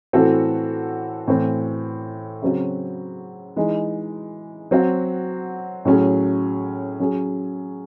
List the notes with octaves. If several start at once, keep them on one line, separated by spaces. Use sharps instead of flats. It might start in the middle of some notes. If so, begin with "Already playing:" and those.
A2 E3 C4 F#4 A4
A2 E3 C4
C#3 F#3 C4 F#4
E3 G#3 D#4
F#3 C4 F#4
A2 F#3 C#4 G#4
F#3 C#4 G#4